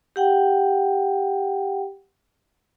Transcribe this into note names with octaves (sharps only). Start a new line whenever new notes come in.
G4 F#5 G5